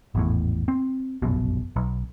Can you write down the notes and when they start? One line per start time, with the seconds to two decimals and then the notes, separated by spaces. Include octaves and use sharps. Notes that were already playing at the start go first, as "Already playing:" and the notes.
0.15 G#1 E2 A2
0.68 C4
1.22 F1 A#1 F#2 B2
1.76 B1